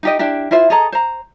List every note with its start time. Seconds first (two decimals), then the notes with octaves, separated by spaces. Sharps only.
0.03 D#4 G4 D#5
0.19 D4 E4 G4
0.51 E4 F4 C5 E5
0.70 G#4 A4 D#5 A#5
0.92 C5 A#5